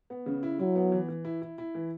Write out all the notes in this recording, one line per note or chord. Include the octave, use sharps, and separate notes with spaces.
B3
C#3
E4
F#3 E4
B3
E3
E3
E4
E4
E4
E3